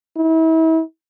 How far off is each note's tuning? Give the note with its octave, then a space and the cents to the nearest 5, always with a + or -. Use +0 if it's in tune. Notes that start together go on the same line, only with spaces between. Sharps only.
E4 -35